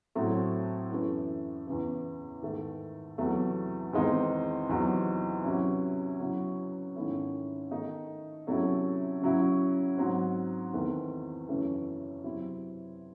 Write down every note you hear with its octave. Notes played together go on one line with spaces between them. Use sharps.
A2 F#3 A3 C4
F#2 E3 A3
E2 C#3 E3
G#2 D#3 A3
E2 C3 F#3 A3
E2 D#3 G#3 C4 D#4
E2 C3 F#3 C4 D#4
C3 F#3 C#4 E4
C#3 F#3 C#4 E4
G#2 D#3 A3 C#4 E4
D#3 A3 D#4
C3 F#3 A3 C#4 E4
C#3 F#3 C#4 E4
G#2 F#3 C4
E2 D#3 A3 C4
F#2 C#3 E3 A3 C#4
C3 F#3 C4 E4